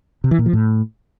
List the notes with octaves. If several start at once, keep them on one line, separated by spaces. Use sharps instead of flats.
C3
E3
A#2
F3
A2